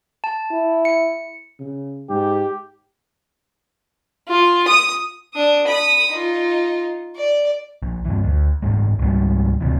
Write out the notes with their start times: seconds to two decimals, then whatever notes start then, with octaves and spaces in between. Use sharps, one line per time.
0.24 A5
0.52 E4
0.85 C#7
1.60 C#3
2.10 G#2 G4
4.28 F4
4.68 D#6
5.34 D4 D#6
5.67 B5 D#6
6.13 D#4 F4
7.16 D5
7.83 A#1
8.05 G2 E3
8.24 D2
8.62 F#1 E2 G#2 G#3
8.99 C#2 G#2 G3
9.61 A1 D2 C3 E3